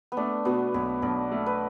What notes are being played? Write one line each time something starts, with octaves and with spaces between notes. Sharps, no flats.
B3
A3 D4
B2 B3
B1 B3
B1 D4
A3
B4